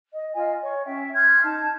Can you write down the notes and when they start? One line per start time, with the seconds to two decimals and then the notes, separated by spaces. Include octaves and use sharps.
0.12 D#5
0.34 F4 D#5 G#5
0.62 C#5 C#6
0.85 C#4 E5 G5
1.14 C6 F6 G6 G#6
1.43 D#4 A5